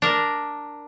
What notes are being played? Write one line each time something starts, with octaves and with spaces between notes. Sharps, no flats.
D4 A#4